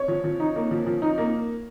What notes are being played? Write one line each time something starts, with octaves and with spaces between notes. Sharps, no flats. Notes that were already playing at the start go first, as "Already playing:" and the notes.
Already playing: C#5
F3
F3
D#4
A#3
F3
F3
D#4
A#3